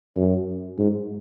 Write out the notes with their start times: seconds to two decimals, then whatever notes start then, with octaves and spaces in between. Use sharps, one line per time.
0.16 F#2
0.78 G#2